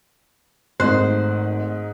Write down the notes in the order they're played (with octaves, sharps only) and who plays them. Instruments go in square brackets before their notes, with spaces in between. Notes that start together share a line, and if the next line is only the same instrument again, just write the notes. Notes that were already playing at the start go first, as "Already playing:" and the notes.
[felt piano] G#1 A3 [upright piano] G#2 D#4 F#6 [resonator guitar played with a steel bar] C5